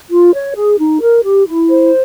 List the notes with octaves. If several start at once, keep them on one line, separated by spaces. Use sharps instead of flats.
F4
C#5
G#4
D#4
A#4
G4
E4
C5